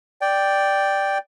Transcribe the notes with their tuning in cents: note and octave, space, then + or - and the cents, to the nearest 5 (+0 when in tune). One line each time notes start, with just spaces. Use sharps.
D5 +0 G5 +0